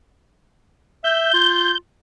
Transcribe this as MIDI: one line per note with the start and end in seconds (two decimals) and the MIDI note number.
1.04 1.32 76
1.04 1.78 91
1.34 1.74 65